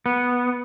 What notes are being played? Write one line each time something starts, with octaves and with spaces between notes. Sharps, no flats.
B3